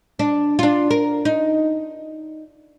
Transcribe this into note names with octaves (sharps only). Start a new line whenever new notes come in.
D4
D4 F4
A#4
D#4